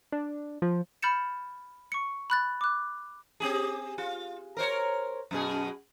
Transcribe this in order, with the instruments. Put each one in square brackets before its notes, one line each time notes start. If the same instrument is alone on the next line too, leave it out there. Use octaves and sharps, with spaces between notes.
[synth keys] D4
F3
[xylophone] B5 F6 G6 A6 C#7 E7
C#6 C#7
B5 F#6 A6
D6 F#6
[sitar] C4 G4 G#4
F4
A#4 C5 C#5
F#2 B2 G#4